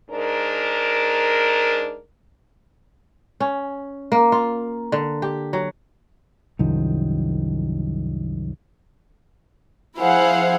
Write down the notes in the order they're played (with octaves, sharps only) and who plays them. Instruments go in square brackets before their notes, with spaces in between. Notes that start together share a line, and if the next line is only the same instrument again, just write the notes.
[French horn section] G#2 D4 A#4
[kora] C#4
A#3
F4
D3
G4
F#3
[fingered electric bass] C2 F#2 D#3 F3
[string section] F3 E4 G#4 C5 F5 F#5